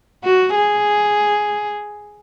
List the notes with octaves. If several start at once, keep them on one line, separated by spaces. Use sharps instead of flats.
F#4
G#4